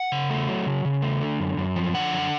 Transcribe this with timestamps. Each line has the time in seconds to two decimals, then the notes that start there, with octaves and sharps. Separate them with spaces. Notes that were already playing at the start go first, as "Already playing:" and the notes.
Already playing: F#5
0.12 C#3
0.30 A3
0.48 F#3
0.66 C#3
0.85 C#3
1.02 A3
1.21 D3
1.40 F#2
1.57 F#2
1.76 F3
1.94 D3 F#5
2.13 F#2